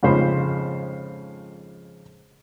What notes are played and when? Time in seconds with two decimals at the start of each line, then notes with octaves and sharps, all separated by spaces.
0.03 F2 G#2 C#3 F3 C5 B5